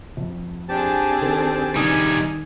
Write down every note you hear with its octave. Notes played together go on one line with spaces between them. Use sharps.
F2
C4 D4 G4 G#4 A5
D#3 A4
D#3 G3 D#4 G#5 D#6